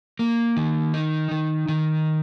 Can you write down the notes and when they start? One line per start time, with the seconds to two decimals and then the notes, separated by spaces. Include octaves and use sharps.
0.19 A#3
0.57 D#3
0.94 D#4
1.31 D#3
1.69 D#3